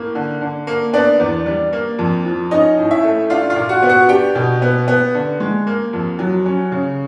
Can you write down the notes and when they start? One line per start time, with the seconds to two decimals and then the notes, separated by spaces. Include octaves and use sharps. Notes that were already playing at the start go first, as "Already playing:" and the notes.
Already playing: A2 A#3
0.15 D3
0.41 D3
0.67 A#3
0.93 B3 D4 D5
1.20 E2
1.46 G3
1.73 A#3
1.99 F2
2.25 F3
2.51 C#4 D#4 D#5
2.77 A2
2.91 E4 E5
3.04 A3
3.30 D4 F4 F5
3.50 F4 F5
3.56 A#2
3.69 F#4 F#5
3.82 B3
3.89 F#4 F#5
4.09 D4 G4 G5
4.35 B2
4.62 B3
4.88 B3
5.14 D3
5.40 G#3
5.67 A#3
5.93 F2
6.19 F#3
6.46 C#4
6.72 C#3